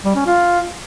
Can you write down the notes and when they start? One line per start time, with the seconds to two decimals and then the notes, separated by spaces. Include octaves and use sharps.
0.05 G3
0.16 C#4
0.26 F4